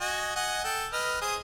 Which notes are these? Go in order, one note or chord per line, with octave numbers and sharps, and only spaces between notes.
F#4 D#5 G#5
D#5 F#5 G#5
A4 G5
B4 D#5 F6
G#4 C5 D#6